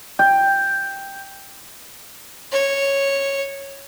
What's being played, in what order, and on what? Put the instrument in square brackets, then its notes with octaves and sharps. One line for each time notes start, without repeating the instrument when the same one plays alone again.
[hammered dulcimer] G5
[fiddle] C#5